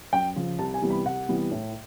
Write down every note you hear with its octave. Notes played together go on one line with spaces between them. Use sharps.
F#2 G5
C#3 F3
C2 A5
G#5
C3 E3 G3 B3
B5
C2 F#5
C3 E3 G3 B3
A2